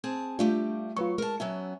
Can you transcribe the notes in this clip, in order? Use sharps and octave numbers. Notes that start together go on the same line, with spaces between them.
C4 G#4 A5
G3 A3 D4 F4 G4
F#3 F4 B4 C#6
G#3 A#4 A5
F#3 B3 C#4 E5